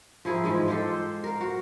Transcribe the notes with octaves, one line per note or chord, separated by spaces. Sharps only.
F3 E4 G#4 A#4
G#2 E3 F3 G#3
G#3 F4 G4 A4
C5
A#4 F5
F#4